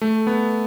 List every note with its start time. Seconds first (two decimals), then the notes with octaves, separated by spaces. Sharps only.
0.01 A3
0.27 B3